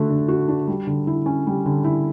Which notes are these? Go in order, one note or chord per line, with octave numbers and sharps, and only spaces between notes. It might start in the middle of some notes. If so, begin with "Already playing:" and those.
Already playing: D3 A3 D4 F#4
D3
F#4
D4
G3
D3
E4
C#4
G3
D3
E4